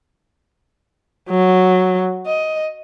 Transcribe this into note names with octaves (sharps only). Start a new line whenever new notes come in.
F#3
D#5